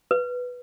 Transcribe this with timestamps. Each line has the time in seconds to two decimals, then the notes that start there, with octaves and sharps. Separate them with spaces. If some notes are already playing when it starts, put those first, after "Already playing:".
0.11 B4